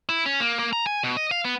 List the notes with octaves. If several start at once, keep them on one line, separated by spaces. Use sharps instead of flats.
E4
C#4
A#3
A#3
A#5
G#5
B2
D#5
F5
B3